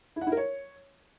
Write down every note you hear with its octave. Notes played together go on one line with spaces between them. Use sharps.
E4
F#5
E4
A#4
C#5